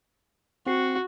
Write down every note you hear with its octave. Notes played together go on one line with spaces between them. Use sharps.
C4 F#4 C7